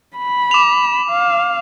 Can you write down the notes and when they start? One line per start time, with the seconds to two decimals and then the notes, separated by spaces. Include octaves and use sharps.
0.17 B5
0.51 D6 F7
1.10 F5